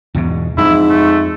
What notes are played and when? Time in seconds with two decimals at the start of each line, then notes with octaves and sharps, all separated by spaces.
0.15 E2 G#2 B2
0.57 F2 G#2 E4
0.89 A3